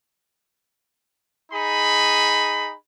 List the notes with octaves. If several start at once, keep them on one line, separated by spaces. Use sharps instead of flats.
D#4 G#4 B5